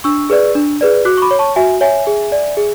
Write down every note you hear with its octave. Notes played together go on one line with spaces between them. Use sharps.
D4 C#6 E6
G#4 B4 D5
D4
G#4 B4 D5
F#4 D6 F#6
C#6
B5 D6
C#5
A5 C#6
F#4 E5 G#5
C#5 E5 G#5
G#4
D5
G#4